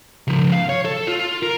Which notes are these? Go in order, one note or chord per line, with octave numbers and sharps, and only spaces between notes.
C#3 F3
F5
C#5
A4
F4
A#4